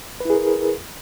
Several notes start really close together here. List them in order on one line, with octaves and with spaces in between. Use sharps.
B4 E4 G#4 A#4